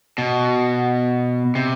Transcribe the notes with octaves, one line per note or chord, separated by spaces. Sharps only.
B2
C3